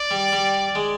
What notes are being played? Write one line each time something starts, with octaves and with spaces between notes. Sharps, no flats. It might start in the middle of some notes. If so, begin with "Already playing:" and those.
Already playing: D5
G3
G3
G#3